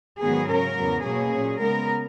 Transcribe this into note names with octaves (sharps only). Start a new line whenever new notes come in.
G#2 D#3 F#3 B3 G#4
C#3 F#3 C#4 A#4
E2 C#3 F#3 B3
B2 F#3 A#3 C#4 G#4
A#2 F#3 C#4
C#3 G#3 B3 A#4